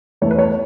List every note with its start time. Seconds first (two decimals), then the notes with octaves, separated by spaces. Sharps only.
0.21 E2 E3 A3 C#5
0.31 B4
0.39 C#5